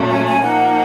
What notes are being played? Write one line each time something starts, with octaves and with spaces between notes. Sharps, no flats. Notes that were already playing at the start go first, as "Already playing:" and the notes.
Already playing: A#2 F#3 A3 C#4
G#5
G#5
F3 A#3 D#4 F#5